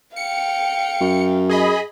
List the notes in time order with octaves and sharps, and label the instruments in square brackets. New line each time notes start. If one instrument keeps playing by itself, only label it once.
[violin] F5 G5 [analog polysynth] C#7
[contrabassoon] F#2
[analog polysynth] G#4 D#5 B5